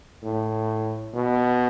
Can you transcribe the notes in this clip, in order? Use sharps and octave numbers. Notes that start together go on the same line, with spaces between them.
A2
B2